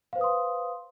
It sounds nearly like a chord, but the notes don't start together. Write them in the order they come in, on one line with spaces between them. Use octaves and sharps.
F5 C5 B4 D#6 C6